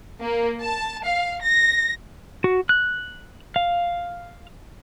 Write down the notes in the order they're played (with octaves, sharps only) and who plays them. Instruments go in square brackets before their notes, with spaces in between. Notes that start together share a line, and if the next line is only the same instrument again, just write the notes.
[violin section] A#3
A5
F5
A#6
[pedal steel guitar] F#4
F#6
F5